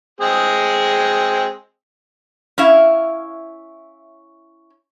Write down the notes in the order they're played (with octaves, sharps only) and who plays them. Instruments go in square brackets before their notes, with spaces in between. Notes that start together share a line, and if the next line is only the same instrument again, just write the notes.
[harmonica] G#3 C4 G#4
[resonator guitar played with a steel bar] C#4 E4 E5 F5